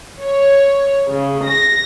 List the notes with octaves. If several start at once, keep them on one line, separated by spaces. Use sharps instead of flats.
C#5
C#3
A#6